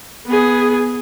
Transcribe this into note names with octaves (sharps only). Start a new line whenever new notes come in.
B3 G#4